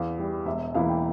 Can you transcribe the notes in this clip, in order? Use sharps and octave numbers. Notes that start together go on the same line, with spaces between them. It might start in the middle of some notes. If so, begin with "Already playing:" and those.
Already playing: E2 F5
E3 G3
E1 E5
E2 E3 A#3 E4 F5
G5